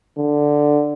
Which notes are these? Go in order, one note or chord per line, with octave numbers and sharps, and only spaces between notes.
D3